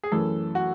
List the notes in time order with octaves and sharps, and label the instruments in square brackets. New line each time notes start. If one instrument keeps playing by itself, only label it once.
[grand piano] G#4
[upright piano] F#2 E3 A3 [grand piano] A4
[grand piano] F#4